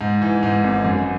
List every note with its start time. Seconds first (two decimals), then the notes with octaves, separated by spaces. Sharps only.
0.01 G#2
0.22 E3
0.43 G#2
0.64 G#1
0.84 F#2